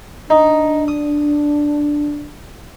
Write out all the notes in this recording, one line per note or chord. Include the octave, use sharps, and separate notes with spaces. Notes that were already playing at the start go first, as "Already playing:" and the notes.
D4 D#4
D#6